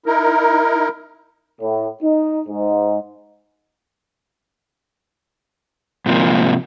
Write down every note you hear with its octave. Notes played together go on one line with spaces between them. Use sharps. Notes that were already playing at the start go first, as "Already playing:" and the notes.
D#4 E4 A#4
A2
D#4
G#2
G#2 C3 F3 A#3